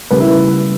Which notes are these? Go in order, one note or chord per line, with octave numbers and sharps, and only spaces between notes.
C#3 G3 A#3 B4
E4